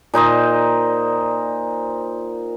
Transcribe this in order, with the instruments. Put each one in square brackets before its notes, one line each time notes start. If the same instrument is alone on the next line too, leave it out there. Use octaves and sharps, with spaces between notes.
[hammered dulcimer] A#2 D#4 C5 D#5